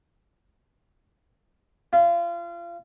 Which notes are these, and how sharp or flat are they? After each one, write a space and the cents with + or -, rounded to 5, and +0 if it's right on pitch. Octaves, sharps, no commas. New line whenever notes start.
F4 -30